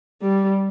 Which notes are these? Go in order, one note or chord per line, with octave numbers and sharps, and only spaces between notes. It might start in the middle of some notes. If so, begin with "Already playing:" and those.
G3